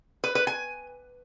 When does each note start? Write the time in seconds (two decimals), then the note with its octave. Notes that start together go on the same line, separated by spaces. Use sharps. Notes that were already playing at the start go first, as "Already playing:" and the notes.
0.24 B4
0.35 B4
0.47 G#5